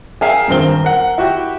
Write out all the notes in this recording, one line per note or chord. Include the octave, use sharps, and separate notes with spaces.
G#4 A#4 E5 F5 G5 G#5
D#1 G2 C4 A#4 G7
A#4 F#5
E4 F#4 G4